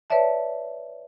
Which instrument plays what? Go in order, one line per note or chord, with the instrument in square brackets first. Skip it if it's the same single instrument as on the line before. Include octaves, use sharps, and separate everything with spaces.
[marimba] B4 C#5 D5 E5 A5